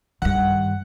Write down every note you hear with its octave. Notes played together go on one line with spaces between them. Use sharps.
G2 D#3 F#5